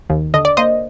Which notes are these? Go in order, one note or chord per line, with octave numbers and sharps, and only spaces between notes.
D#2
D3 D#5
D5
A#3 C5 D#5